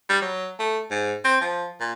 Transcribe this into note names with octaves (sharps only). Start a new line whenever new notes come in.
G3
F#3
A3
G#2
C4
F3
A#2